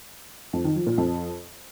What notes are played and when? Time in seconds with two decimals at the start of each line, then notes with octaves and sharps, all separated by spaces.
0.53 F2
0.64 D#3
0.76 F3
0.87 A#2
0.98 F2